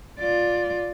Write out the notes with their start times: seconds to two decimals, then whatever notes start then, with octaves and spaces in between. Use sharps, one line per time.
0.20 F4 D5